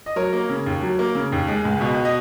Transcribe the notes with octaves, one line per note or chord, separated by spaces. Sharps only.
D#5
F#3 A#4 C#5
A#3
C#3
D#2
F#3
A#3
C#3
D#2
G#3
C#2
B2
D#5